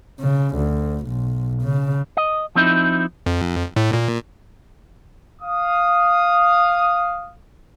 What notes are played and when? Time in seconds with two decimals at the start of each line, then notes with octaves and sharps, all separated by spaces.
0.20 C#3
0.56 D2
1.07 B1
1.63 C#3
2.17 D#5
2.55 F3 C4 D#4 E4
3.26 F2
3.76 A2
3.93 A#2
5.42 F5 D#6